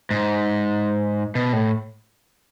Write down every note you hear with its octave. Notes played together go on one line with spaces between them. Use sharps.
G#2
B2
A2